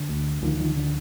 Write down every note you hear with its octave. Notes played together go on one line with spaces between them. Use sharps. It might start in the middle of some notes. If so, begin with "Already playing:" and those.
Already playing: D3
D2
D2 D#3 F3
D#3 F3
D3